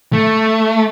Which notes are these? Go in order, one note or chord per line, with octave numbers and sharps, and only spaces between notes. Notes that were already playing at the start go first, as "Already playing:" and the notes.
A3